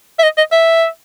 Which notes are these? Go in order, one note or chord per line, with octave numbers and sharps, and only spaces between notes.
E5
D#5
D#5
E5